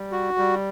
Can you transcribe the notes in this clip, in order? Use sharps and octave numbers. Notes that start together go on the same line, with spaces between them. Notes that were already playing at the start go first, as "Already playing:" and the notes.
Already playing: G3
F#4
G3